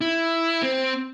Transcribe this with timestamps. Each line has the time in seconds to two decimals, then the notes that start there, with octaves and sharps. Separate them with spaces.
0.01 E4
0.63 C4